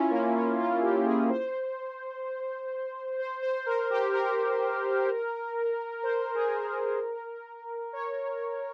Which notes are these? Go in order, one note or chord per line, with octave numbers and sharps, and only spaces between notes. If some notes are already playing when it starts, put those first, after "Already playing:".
Already playing: C#4 E4 F4
A#3
C#4
F4
G4
G#4
C5
C5
C5
A#4
G4
A#4
C5
G#4
A#4
C#5